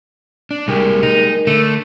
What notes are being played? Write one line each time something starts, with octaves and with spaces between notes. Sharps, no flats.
D4
C2 G#3 G4 A#4
D#4
D3 A3